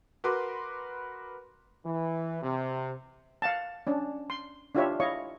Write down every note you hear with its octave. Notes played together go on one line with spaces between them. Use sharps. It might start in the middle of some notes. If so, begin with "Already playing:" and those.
F#4 A#4 B4 B5 C6 D6
E3
C3
F5 F#5 A5
C#4 D4
C6
D4 E4 F4 G4 C#5 E5
E4 C#5 D#5 F5 C#6